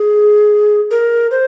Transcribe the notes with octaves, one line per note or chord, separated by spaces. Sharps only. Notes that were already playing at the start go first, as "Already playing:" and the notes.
Already playing: G#4
A#4
C5